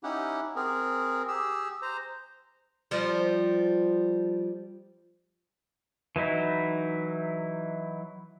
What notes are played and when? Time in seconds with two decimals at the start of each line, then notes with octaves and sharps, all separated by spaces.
0.03 C#4 D#4 E4 G4 F#5
0.56 C4 G#4 A#4
1.28 G4 G#4 E6
1.82 C5 A#5
2.91 F3 G3
6.16 E3 F#3 D#4 E4